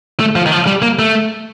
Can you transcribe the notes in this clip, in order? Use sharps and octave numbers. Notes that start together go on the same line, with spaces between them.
A3
F3
D#3
F3
G3
A#3
A3